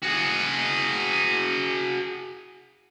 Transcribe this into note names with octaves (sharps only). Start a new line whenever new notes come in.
F#4 G#4